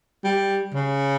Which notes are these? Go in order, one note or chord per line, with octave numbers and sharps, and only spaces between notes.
G3
C#3